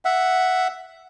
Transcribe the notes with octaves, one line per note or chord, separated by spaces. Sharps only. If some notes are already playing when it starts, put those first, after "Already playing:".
E5 F#5